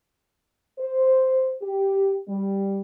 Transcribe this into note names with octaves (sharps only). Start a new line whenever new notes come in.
C5
G4
G3